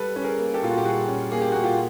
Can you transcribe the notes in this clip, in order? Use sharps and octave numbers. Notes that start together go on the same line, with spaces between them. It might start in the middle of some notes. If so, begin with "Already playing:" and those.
Already playing: G3 A4 B4
C#4 B4
G#4 A#4
A#3
G4 A4
A#2 F4
F#4
G4
G3 F#4 G#4
C#4
A#3 G#4
G4
A#2 F#4
F4 G4